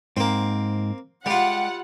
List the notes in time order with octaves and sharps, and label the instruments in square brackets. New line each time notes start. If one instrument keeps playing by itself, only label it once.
[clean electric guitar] G#2 [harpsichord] A#3 C4
[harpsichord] G3 F4 [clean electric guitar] G#3 G4 [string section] F#5